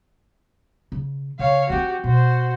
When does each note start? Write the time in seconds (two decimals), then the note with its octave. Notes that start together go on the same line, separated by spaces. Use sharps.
0.92 C#3
1.39 C#3 C#5 F5
1.69 F3 C4 F#4 G4
2.04 B2 F#4 C5